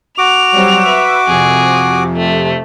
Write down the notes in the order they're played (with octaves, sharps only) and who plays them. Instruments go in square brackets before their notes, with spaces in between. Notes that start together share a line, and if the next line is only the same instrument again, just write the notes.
[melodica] F#4 D6 [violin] F7
[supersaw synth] F#3 G3 C4
B4 E5
[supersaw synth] F2 C3 [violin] G#4
[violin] A3